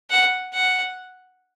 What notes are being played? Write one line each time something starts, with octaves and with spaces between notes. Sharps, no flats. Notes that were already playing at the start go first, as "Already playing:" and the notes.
F#5
F#5